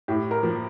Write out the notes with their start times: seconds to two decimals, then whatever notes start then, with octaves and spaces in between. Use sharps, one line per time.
0.08 A2 G4
0.31 A#4
0.43 F3 A#3